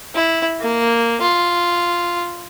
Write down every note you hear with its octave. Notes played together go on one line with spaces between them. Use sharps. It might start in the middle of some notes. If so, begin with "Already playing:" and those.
E4
A#3
F4